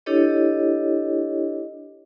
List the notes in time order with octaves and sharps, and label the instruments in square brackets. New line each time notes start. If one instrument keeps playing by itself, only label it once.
[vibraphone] D4 E4 G4 A4 C#5 D#5